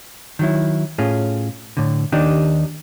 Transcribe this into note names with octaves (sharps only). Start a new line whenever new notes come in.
D#3 F#3 E4
A2 C#4 F4 G#4
A2 D3
D#2 D#3 D4 D#4 G4